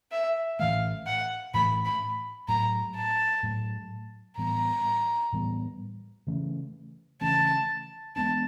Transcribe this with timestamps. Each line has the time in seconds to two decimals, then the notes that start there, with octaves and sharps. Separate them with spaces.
0.12 E5
0.59 A2 E3 A3 F5
1.06 F#5
1.54 A2 E3 A3 B5
1.85 B5
2.48 A2 F#3 A3 A#5
2.96 A5
3.43 A2 F#3 A3
4.38 A2 E3 G3 B3 A#5
5.32 A2 E3 G3 B3
6.27 C#3 E3 A3 C#4
7.21 C#3 E3 A3 C#4 A5
8.16 E3 G#3 B3 D4 A5